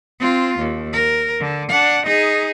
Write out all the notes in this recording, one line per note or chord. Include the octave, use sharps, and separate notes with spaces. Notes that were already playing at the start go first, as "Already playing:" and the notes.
C4 F4
D#2
A#4
D3
D4 F#5
D#4 G#4